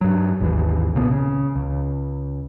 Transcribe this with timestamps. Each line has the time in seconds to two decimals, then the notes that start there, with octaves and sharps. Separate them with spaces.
0.01 G2 F#3
0.40 G#1 D#2 D#3 E3
0.95 C2 A#2 C#3 B3
1.11 C#3
1.56 C#2